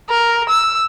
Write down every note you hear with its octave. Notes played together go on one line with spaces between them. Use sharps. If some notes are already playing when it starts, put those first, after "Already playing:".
A#4
E6